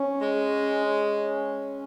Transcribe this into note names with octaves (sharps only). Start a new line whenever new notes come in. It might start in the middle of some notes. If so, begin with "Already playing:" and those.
Already playing: C#4
G#3
C#4